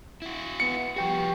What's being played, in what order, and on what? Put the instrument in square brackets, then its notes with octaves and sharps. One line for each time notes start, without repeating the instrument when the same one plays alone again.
[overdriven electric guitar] E4 F#4
[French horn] B3 [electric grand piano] C#7
[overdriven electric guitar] F3 F#4 [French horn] B3 [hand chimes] G4 G5 C#6